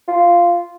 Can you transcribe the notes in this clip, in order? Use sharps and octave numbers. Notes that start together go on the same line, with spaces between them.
F4